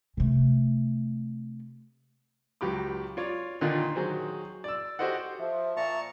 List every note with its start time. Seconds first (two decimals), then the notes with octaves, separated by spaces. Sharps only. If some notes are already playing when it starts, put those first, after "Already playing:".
0.17 C3 A3
2.61 C#2 F#3 G4 B5 D6
3.17 F4 C#5 D5
3.61 A#2 D3 D#3 F4 D5 D#5
3.96 D#3 F#3 G#4 C5
4.64 D5 E6
4.99 F#4 G4 A4 C5 D#5 F#5
5.39 F3 E5
5.77 A#2 A5 A#5 C#6